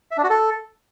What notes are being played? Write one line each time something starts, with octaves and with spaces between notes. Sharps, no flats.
E5
D4
F#4
A4